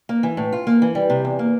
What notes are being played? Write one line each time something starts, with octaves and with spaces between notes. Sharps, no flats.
A#3
E3
A2
F4
A#3
E3
G3
C3
E2
A#3